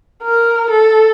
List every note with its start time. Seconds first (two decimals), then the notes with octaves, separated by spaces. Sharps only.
0.23 A#4
0.70 A4